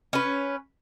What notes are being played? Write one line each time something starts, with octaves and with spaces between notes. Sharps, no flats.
C#4 B4